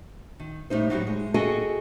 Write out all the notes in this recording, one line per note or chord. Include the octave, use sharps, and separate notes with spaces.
D#3
A2 G3 D#4 C5
F#3 G3 D#4 F4 G4
G#3
F#4 G#4 A4 D#5 G5 G#5